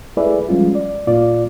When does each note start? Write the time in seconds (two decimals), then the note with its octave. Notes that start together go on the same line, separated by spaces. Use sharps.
0.17 A3 E4 G#4 B4 D5 E5
0.49 F3 G3 G#3 C#4 F4
0.75 D5
1.07 A#2 A#3 F4 D5